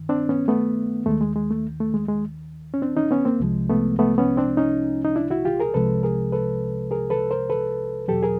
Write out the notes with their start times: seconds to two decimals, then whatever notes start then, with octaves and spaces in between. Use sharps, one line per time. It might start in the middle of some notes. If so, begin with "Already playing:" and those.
Already playing: G2 D#3
0.09 C4 D4
0.29 B3 C#4
0.48 A3 B3
1.06 D#2 D#3 G#3 A3
1.21 G#3
1.36 G#3
1.50 A3
1.80 A3
1.94 G#3
2.08 G#3
2.74 C#4
2.82 C4 D4
2.97 C#4 D#4
3.11 B3 C#4
3.25 A#3 C4
3.40 C2 C3 F3 G#3
3.69 A3 B3
3.99 A3 B3
4.18 B3 C#4
4.37 C4 D4
4.57 C#4 D#4
5.05 D#4
5.16 D4 E4
5.30 E4 F#4
5.45 F4 G4
5.60 G#4 A#4
5.74 C2 C3 F3 G#3 A4 B4
6.03 G#4 A#4
6.32 A4 B4
6.91 G#4 A#4
7.10 A4 B4
7.31 A#4 C5
7.50 A4 B4
8.08 E2 B2 F#3 G4 A4
8.23 G#4 A#4